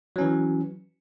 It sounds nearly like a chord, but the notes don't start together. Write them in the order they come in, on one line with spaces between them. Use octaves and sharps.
F#3 C#4 E3